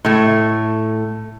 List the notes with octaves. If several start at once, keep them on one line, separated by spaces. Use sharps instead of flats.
A2 A3